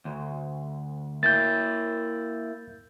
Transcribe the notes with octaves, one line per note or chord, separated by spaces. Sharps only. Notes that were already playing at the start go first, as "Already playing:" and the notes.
D2
A#3 E4 G6 A6